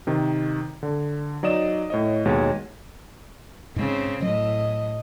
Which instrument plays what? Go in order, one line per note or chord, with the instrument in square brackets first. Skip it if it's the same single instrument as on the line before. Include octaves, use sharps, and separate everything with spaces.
[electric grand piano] C3 D#3
D3
F#3 D#4 D5 D#5 D#6 E7
A2 C#5 D#5
D#2 B2 G#3 C#5
[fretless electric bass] G#2 G#3 [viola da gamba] C#3 C4
[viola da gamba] A2 D#5 [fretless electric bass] F#3